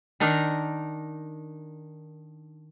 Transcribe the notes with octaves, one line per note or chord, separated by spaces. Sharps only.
D#3 D4 D#4 A#4